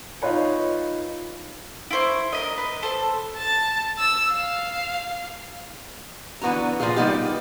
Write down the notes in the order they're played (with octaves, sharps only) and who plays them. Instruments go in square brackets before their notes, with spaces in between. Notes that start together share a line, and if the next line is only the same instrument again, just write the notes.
[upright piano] D#4 F4 B4 C#5
[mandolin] E4 C5 C#6
A#4 B4 D#5
B4
A4 C5
[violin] A5
E6
F5
[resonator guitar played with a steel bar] D3 E3 B3 F#4 A#5
A#2 D#3 F3 F4 G#4
G3 A#3 B3 D#4 G4